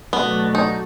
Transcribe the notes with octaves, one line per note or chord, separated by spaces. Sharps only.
B2 F#3 A3 B3 D4 F#4
D#4